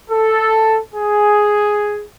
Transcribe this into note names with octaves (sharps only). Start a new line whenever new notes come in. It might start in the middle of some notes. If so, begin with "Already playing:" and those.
A4
G#4